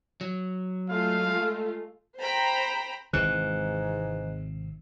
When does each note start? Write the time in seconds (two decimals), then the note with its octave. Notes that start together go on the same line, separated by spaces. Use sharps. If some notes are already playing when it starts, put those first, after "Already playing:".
0.21 F#3
0.89 G#3 A3 F4 F5
2.20 C5 G5 A#5 B5
3.13 G#1 G#2 C3 E3 F#6